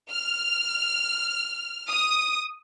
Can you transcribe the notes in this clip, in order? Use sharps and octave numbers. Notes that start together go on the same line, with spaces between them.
F6
D#6